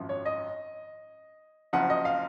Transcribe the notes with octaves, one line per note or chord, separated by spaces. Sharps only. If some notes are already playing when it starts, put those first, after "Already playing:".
Already playing: G#1 F#2 F3
C#5
D#5
F#1 F#2 F3 F#5
D#5
F5